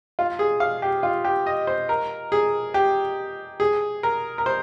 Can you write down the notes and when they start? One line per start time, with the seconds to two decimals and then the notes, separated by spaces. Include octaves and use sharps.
0.19 F4
0.39 G#4
0.60 F5
0.82 G4
1.03 F4
1.25 G4
1.46 D#5
1.67 C5
1.89 A#4
2.32 G#4
2.74 G4
3.60 G#4
4.03 A#4
4.38 A#4
4.46 C5